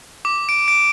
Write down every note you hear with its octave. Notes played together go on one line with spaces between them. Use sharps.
D6
D7
D7